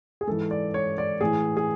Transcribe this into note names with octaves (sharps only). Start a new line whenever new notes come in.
G#4
G#2 E3 A4
D5
C#5
D5
A2 E3 G#4
G#4